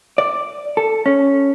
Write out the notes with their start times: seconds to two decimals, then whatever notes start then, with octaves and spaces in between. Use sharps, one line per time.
0.18 D5
0.77 A4
1.06 C#4